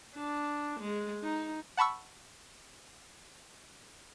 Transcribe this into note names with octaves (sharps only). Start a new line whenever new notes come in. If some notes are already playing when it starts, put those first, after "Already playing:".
D4
G#3
D#4
F#5 A5 B5 C#6 E6